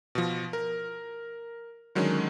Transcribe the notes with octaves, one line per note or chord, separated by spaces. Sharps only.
B2 F3
A#4
D3 D#3 F#3 G#3 C#4